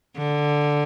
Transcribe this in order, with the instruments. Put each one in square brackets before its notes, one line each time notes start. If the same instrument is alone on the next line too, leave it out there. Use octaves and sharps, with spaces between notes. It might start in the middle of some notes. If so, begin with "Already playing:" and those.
[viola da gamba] D3